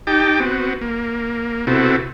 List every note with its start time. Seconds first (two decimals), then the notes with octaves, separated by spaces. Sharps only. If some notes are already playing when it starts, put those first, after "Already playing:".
0.07 D#4 G4 G5 A5 D6
0.40 B3 C4 F#4
0.81 A#3
1.67 C3 B3 C4 E4 F#4 A4